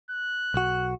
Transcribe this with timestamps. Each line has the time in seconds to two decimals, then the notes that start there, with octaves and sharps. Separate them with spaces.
0.11 F#6
0.54 B1 F#4